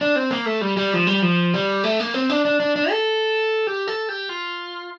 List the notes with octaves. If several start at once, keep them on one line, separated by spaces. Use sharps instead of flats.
D4
C4
A#3
A3
G3
G3
F3
G3
F3
G3
A3
A#3
C4
D4
D4
D4
D4
A4
G4
A4
G4
F4